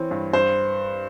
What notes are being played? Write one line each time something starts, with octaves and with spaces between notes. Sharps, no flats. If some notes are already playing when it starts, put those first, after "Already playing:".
Already playing: E3 C4 C#5
G2
G2 C5